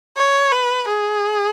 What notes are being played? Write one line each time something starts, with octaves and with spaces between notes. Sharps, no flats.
C#5
B4
G#4